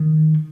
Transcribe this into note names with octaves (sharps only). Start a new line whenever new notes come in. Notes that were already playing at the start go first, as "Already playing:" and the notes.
Already playing: D#3